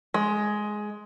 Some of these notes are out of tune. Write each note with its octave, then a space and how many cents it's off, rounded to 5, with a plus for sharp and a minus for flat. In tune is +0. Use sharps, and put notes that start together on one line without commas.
G#3 +10